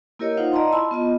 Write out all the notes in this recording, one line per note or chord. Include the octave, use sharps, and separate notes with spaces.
A#3 E4 G4 A#4 C#5 D#5
D#4 F4 C5 F5 F#5
D5 D#5 A5 A#5 C6
E4 A5 B5 C6 E6
B3 F4 D#5